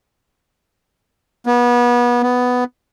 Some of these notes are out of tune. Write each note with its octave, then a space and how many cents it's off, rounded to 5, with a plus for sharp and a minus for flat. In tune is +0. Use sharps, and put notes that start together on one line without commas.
B3 -30
B3 +5